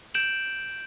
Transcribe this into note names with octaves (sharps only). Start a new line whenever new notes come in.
G6 D7 E7 F#7